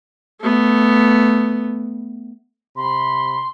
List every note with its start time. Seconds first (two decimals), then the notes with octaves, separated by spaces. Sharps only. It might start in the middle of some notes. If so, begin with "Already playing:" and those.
0.41 A3 B3
2.77 C3 B5 C6